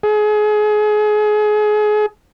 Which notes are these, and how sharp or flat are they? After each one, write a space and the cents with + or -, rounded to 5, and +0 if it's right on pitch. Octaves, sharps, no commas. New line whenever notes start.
G#4 +30